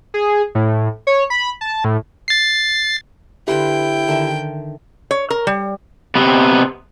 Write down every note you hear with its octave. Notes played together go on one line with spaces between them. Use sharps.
G#4
A2
C#5
B5
A5
A2
A6 C7
D3 E4 G4 B4 G5 C6
D3 D#3 E5
C#5
A#4
G3
C3 B3